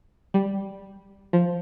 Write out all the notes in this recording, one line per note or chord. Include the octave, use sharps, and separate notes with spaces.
G3
F3